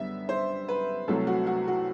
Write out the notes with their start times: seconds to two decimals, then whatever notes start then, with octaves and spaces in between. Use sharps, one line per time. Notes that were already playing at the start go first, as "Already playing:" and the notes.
Already playing: F#2 D3 G3 B3 E5
0.29 C5
0.69 B4
1.08 C2 C3 F#3 A3 A4
1.27 F#4
1.47 F#4
1.68 F#4